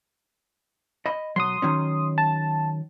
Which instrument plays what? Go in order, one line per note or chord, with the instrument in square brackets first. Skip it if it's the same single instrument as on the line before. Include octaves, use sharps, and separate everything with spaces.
[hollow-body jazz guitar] D#5 B5
[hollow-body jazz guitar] B1 F#3 [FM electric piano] C6 D#6
[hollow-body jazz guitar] D#3 F#3 C#4
[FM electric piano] A5